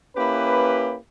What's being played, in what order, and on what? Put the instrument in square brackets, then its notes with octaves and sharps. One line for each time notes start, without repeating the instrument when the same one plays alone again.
[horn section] A#3 C#4 E4 G4 B4